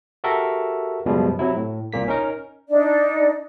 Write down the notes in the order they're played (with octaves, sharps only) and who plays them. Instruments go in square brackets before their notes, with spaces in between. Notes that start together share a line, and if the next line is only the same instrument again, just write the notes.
[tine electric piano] F#4 G4 A4 A#4 E5
C#2 F#2 B2 F3 G3 G#3
C3 F#3 E4
A2
C2 A#2 A#3 B6
C#4 D#4 A#4
[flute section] D4 D#4 D5